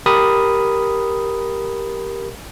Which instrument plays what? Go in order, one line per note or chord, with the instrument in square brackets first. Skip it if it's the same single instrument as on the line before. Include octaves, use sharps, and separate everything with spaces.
[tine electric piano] G4 A#4 B5 D#6